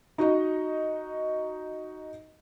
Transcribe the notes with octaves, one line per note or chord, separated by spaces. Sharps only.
D#4 F#4 D#5